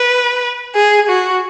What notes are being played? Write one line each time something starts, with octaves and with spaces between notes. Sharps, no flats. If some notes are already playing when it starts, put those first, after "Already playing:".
Already playing: B4
G#4
F#4